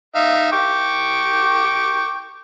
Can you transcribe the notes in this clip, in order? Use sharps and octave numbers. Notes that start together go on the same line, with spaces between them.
D#4 E5 F5
G5 C#6 D6